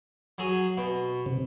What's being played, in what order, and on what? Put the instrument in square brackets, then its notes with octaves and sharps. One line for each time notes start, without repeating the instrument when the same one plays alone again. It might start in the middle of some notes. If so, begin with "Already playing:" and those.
[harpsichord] F#3 G#4 D#6
B2
[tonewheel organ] C3